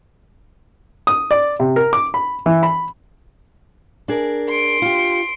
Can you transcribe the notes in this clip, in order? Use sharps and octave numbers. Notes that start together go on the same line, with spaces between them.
D#6
D5
C3
A#4
D6
B5
E3
B5
D4 G#4 A#4
C6 D7
F4 G4